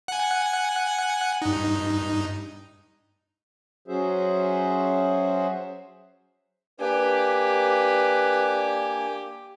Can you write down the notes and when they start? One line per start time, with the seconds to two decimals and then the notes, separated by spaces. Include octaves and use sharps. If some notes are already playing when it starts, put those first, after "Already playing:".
0.08 F#5 G#5
1.42 G2 D#4
3.88 F#3 C#4 F#4 G#4 C5 E5
6.80 A#3 D4 G4 B4 G#5